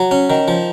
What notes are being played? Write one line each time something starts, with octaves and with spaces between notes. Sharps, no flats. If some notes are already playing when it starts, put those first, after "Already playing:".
Already playing: F#3
C#4
D#3
F3